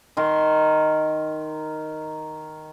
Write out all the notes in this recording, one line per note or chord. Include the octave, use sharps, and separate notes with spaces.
D#3 A#4 C6